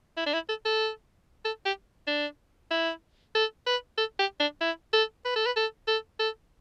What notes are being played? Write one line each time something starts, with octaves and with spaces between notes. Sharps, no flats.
E4
D4
E4
A4
A4
A4
G4
D4
E4
A4
B4
A4
G4
D4
E4
A4
B4
A4
B4
A4
A4
A4